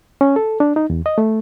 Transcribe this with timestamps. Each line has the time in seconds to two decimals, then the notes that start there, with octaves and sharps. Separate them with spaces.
0.21 C#4
0.36 A4
0.60 D4
0.76 D#4
0.90 E2
1.06 D#5
1.18 A3